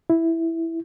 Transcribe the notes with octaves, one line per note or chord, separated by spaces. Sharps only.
E4